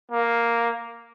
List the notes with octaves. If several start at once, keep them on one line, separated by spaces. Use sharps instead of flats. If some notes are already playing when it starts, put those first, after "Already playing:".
A#3